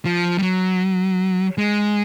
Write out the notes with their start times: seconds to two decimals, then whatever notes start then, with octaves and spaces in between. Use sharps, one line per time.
0.05 F3
0.38 G3
0.43 F#3
1.58 G#3